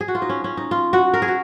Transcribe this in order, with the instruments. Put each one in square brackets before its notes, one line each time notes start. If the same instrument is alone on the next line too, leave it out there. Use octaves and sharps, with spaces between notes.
[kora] G#4
F#4
F4
D#4
C#4
C#4
D#4
F4
F#4
A#4
G#4
F#4